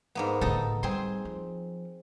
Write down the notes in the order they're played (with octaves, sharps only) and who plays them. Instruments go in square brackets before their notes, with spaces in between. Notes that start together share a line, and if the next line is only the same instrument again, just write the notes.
[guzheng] G#2 A#3 B3
[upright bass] A2 D3 [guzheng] D#4 A4
[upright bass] G3 [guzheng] C4 G#4 C6
[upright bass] F3